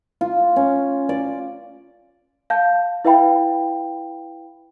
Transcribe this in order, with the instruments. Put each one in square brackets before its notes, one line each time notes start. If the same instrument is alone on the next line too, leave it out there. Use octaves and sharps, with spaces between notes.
[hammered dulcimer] F4
C#4
D5
[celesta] F5 A5 G6
E4 B4 E5 F5 G5 B5